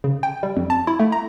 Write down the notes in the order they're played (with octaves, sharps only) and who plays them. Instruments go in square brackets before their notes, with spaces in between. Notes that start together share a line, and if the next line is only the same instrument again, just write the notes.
[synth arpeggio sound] C#3
G5
G3
F2
A5
E4
A3
A#5